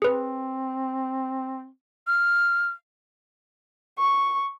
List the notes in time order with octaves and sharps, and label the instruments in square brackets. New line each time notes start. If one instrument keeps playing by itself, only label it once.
[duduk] C4 [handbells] G#4 B4
[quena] F6
[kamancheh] C#6